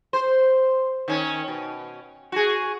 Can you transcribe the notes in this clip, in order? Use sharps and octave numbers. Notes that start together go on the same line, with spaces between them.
C5
D#3 C#4
B2
F#4 G#4